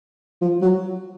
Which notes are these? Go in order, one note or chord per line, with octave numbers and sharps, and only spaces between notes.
F3
F#3